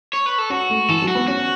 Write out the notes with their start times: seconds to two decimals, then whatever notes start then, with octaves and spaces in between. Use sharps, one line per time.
0.13 C#5
0.26 B4
0.38 A4
0.50 C#4 F#4
0.70 A3
0.89 E3 A4
1.02 F#3
1.08 F#4
1.15 B3
1.28 C#4 F#4